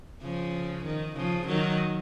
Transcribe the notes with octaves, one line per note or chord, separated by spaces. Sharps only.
C#3 F3
D#3
C#3 F3
D#3 F#3